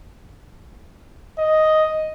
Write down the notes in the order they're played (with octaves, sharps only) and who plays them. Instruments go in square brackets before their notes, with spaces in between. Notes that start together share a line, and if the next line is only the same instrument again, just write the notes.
[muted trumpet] D#5